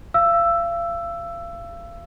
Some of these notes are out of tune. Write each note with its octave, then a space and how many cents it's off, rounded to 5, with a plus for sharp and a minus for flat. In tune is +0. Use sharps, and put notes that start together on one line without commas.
F5 -35 E6 +10